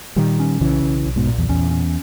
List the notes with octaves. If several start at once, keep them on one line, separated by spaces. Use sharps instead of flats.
A#2 D#3 G3
C#4
B1 C#3 E3
B1
B1
G#2 B2
A#2
E2
E2 C#4
C#4